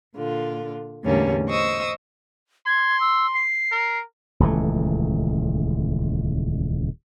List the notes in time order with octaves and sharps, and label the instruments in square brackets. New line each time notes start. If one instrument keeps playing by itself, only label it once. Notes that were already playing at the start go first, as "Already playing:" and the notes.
[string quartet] A#2 D3 F4
E2 A2 D3 G3 A#3 C#4
C5 D#5 C#6 D#6 E6
[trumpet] C6 [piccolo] G#6
[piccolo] E6
C7
[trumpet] A#4
[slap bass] D#1 C#2 E3 A3